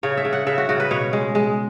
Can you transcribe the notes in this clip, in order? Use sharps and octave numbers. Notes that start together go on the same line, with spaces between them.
C#3 C#5
E5
C#3
F#5
C#3 E5
F#4
C#3 F#4
B4
B2 C#5
G#3
G#3